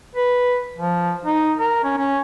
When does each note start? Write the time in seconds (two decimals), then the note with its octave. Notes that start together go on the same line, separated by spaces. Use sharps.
0.15 B4
0.78 F3
1.25 D#4
1.58 A#4
1.84 C#4
1.97 C#4